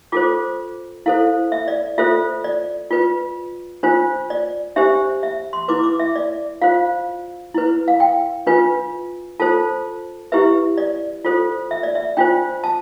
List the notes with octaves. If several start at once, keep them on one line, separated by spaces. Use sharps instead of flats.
F4 A4 C5 D6
E4 A4 C5 F5
E5
D5
F4 A4 C5 E5
D5
F4 B4
D4 F4 C5
D5
D4 G4 C5 E5
E5
C6
E4 B4 D6
D6
E5
D5
F4 C5 F5
E4 B4
F5
G5
D4 F4 B4
F4 A4 C5 A5
E4 G4 B4 E5
D5
F4 A4 C5
E5
D5
E5
D4 F4 C5 G5
A5